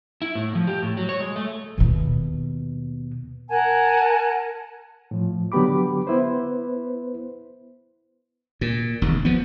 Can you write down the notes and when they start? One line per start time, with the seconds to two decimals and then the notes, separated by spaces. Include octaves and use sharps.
0.22 E4
0.35 A2
0.55 F3
0.67 G4
0.82 A2
0.97 F#3
1.09 C#5
1.20 G#3
1.36 A3
1.78 D#2 B2
3.50 A#4 F#5 G#5 A5
5.11 A2 F3
5.52 D3 F#3 B3 G4 B5 D6
6.07 B3 E4 B4 C5
8.61 A#2
9.02 E1 D#2
9.25 F3 B3